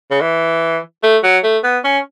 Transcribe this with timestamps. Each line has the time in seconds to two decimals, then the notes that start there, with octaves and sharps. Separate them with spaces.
0.11 C#3
0.21 E3
1.03 A3
1.23 F#3
1.43 A3
1.64 B3
1.84 C#4